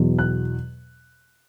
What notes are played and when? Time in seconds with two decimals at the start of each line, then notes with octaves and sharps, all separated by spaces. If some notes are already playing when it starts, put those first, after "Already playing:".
Already playing: E2 B2 F#3
0.19 F#6